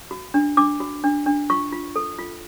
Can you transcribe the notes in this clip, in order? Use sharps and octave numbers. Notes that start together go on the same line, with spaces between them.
F#4
D4
D4 D6
F#4
D4
D4
F4 C#6
F4
A4
F4